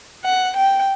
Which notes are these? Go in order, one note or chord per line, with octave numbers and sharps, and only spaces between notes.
F#5
G5